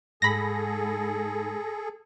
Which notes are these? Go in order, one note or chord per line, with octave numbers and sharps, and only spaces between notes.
G#2 G#4 A4 B5 A#6